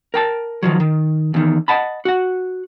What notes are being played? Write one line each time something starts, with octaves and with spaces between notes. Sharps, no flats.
A#4 G5 A5
D#3 F3 F#3
D#3
E2 D#3
D#5 F#5 A5 B5
F#4 F#5